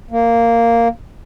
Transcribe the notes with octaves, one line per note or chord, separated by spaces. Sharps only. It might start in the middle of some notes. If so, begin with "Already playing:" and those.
A#3